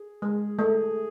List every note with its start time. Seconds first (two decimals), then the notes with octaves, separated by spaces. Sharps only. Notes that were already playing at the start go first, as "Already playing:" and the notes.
Already playing: G#4
0.22 G#3
0.59 A3 G#4